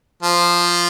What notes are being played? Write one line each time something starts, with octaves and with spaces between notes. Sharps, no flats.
F3